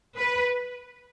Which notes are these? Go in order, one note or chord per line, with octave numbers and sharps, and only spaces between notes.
B4